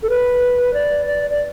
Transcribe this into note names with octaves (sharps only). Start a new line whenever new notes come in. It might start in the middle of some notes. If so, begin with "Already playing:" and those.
A4
B4
D5
D5
D5